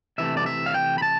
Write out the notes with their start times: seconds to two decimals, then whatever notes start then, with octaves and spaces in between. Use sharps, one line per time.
0.18 C3 E3 A3 E5
0.37 D5
0.46 E5
0.66 F5
0.74 G5
0.98 B5
1.02 A5